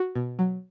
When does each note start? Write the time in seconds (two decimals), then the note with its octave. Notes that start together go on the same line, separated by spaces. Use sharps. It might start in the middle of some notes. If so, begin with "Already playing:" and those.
Already playing: F#4
0.15 B2
0.39 F#3